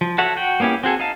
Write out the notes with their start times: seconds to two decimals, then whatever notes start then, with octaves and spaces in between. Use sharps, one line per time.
0.01 F3
0.18 F#4 A4 C#5 E5 F#5
0.37 F#4 G5
0.60 A#3 B3 C#4 E4 G4
0.84 C4 F#4 G#4 A4
1.00 D#4 F5 A5